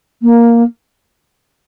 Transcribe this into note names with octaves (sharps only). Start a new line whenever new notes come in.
A#3